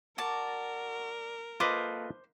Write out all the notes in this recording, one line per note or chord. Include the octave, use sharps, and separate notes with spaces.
F#4 A#4 D5 A5
A#3 F4 A4 B4 C5 D#5 D6